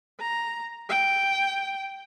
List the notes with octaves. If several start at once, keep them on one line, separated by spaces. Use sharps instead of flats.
A#5
G5